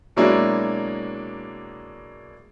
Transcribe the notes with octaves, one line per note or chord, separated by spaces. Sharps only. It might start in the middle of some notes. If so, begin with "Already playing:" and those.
B2 F#3 G#3 A#3 D4 E4